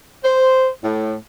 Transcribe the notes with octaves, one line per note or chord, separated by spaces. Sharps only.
C5
A2